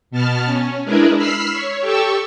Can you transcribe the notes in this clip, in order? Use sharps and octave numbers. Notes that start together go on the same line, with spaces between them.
B2 B3 A5 F6
C#4
G#3 D4 E4 G#4 A#4 B4
B5 E6 F6 B6 C7
C#5
G4 A4 C#6 E6